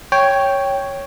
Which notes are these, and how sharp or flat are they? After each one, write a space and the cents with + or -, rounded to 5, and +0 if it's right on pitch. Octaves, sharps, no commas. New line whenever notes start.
C#5 +0 G5 +0